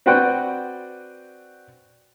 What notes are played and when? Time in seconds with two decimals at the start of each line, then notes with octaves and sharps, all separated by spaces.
0.06 C4 F#4 B4 D5 F#5 G5